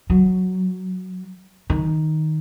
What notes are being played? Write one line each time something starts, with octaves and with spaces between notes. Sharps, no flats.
F#3
D#3